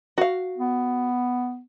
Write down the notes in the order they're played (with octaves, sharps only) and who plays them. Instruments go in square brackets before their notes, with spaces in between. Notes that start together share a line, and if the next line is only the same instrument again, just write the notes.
[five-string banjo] F#4 F5
[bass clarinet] B3